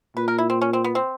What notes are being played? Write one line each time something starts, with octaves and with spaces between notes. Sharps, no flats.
A#2 B4
A#4
E4
C4
C#4
C4
B3
C4